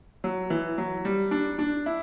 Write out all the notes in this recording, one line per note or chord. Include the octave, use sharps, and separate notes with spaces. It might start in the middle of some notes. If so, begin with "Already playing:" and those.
F#3
E3
F#3
G3
D4
D4
E4